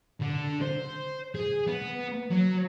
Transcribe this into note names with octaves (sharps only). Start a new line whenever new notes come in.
D3
C5
G#4
B3
F#3